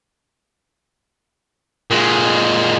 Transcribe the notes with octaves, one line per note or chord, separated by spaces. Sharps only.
A#2 G#3